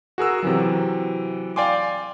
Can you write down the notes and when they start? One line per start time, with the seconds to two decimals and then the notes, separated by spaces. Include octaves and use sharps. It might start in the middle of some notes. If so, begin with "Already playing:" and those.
0.18 F#4 G#4 A#4 E6
0.43 C3 E3 F#3
1.56 D5 F5 G5 G#5 C6 D6